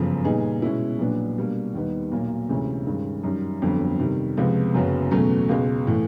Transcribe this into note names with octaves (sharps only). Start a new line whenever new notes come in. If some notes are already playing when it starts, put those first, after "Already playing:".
Already playing: G1 F#2 C#3 F3
A#2 G3 B3 D#4 G#4
B2 G#3 C#4 E4
A#1 A#2 F#3 B3 D4
B2 G3 A#3 D4
D#2 D#3 G3 B3 D#4
B1 A#2 F#3 A#3
D2 C3 E3 G#3 C#4
G2 D#3 G#3 C#4
F#2 D#3 G3
G1 F2 D3 F#3
C3 D#3 G3
C#2 C3 F3 G#3 B3
F#1 F#2 C#3 F#3 B3
E2 B2 F#3 A3 C#4
C#2 B2 G#3
A2 E3